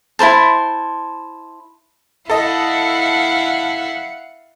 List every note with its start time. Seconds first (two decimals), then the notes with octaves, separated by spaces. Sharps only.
0.19 E4 A#4 C5 A5
2.30 E4 A4 D#5 F5 F#5